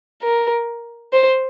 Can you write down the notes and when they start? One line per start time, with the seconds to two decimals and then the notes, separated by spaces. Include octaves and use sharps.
0.22 A#4
1.12 C5